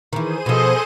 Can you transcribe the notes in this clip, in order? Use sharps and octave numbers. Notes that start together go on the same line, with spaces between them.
D#3 E3 G#4 C5 D#7
B2 F3 A4 D#5